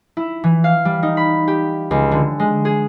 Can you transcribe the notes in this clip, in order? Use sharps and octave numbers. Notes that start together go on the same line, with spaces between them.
E4
E3
F5
G3
D#4
B5
G4
C#2
D3
G#3
G#4